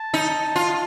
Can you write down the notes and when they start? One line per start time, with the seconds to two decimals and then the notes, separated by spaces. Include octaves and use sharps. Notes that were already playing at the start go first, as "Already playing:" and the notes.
Already playing: A5
0.14 D#4
0.56 F4